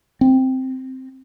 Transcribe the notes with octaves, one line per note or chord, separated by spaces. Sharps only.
C4